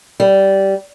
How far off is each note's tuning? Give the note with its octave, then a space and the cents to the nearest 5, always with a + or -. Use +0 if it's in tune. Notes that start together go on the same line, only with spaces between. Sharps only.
G3 -15